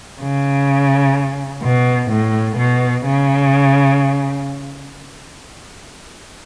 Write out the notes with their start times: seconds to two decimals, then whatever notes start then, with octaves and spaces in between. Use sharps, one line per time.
0.20 C#3
1.63 B2
2.11 A2
2.57 B2
3.05 C#3